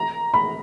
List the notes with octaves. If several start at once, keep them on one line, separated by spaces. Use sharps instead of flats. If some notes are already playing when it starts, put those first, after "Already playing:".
Already playing: A#5
B5